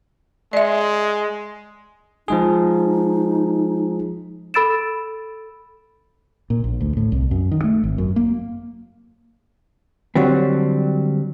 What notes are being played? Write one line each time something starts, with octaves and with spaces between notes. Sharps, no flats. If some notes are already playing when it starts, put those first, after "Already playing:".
G#3 D5 E5
F3 G#3 D#4 G#4
A4 B5 E6 A6 D7 E7
A#2
A#1
D2
A2
C2
F#2
D#3
A3
G#1
F#2
A#3
D3 F#3 G3 C4